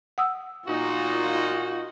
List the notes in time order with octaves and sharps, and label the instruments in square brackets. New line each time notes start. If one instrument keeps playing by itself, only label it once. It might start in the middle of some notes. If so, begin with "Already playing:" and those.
[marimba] F#5 D#6 E6
[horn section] A#2 D#4 [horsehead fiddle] F4 [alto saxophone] F#4